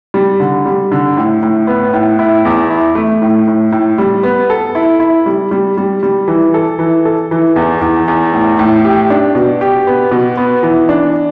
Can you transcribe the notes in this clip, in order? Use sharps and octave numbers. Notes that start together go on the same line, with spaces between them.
G3
D3
G3
D3
A2
A2
B3
A2
E4
E2
E4
A3
A2
A2
A2
G3
B3
A4
E4
E4
G3
G3
G3
G3
E3
A4
E3
A4
E3
E2
E2
E2
A2
A2
G4
D4
B2
G4
B3
B2
B3
E3
D4